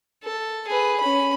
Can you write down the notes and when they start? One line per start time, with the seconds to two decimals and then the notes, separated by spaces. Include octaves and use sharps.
0.23 A4
0.67 G#4 B4
1.01 C#4 B5